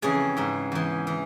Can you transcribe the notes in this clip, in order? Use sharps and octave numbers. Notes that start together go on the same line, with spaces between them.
F2 C#3 E3 G#4
G#2 E3
E2 E3
E3